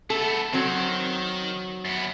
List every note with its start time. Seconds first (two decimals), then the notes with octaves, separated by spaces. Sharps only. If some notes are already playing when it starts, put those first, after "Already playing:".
0.10 A3 B3 A4
0.53 D#3 F#3 C4
1.85 F#2 B3